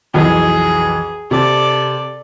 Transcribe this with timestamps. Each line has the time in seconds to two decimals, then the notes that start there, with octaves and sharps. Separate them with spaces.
0.14 B1 F2 E3 G#4
1.31 C3 A4 D5